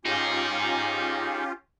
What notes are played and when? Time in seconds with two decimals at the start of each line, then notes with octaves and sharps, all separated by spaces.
0.05 C#4 D#4 F4 G4 G#4